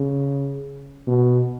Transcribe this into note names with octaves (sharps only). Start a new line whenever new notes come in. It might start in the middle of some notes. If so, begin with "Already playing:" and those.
Already playing: C#3
B2